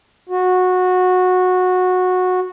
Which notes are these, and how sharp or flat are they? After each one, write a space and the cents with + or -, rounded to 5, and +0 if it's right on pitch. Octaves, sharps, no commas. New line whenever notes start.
F#4 -15